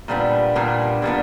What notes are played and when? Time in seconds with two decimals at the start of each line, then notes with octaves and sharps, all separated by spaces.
0.08 A#2 G3 B3 D4
0.55 A#2 G3 B3 D4
1.02 A#2 G3 B3 D4